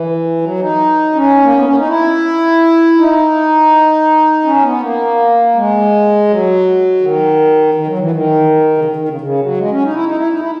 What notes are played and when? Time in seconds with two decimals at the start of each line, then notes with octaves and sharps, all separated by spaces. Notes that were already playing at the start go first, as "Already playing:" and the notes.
Already playing: E3
0.41 F#3
0.60 D#4
1.15 C#4
1.42 A#3
1.54 B3
1.65 C#4
1.77 D#4
1.88 E4
2.97 D#4
4.44 C#4
4.62 B3
4.81 A#3
5.55 G#3
6.28 F#3
7.01 D#3
7.74 D#3
7.87 F#3
7.99 E3
8.11 D#3
8.78 C#3
8.85 D#3
8.96 D#3
9.08 C#3
9.21 C#3
9.40 F#3
9.57 G#3
9.71 C#4
9.83 D#4
9.93 E4
10.05 D#4
10.17 E4
10.29 D#4
10.39 E4